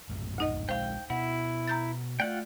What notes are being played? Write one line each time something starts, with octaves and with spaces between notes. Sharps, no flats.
A#1 F#2 A2
D2 D#4 D#5
A#1 G#3 C5 F5 G5
B2 B3 E4 F#5
A#5 G6 A6
A3 F4 D5 F#5 G5